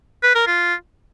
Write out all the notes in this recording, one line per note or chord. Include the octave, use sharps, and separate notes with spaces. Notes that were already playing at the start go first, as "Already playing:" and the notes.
B4
A#4
F4